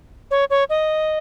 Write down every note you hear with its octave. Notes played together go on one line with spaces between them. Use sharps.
C#5
C#5
D#5